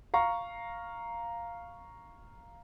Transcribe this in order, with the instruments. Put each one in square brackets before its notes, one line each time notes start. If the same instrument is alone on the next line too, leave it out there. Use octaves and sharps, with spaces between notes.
[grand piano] F5 A#5 C#6